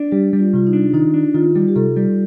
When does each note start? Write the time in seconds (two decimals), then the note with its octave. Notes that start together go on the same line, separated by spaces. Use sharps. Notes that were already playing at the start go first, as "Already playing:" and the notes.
Already playing: D4
0.12 G3 G4
0.33 G3
0.39 F4
0.53 C3 F4
0.67 D#4
0.73 D4
0.93 D#3 D#4
1.14 D4
1.34 D#3 F4
1.56 G3
1.68 G4
1.76 C3 A4
1.97 G3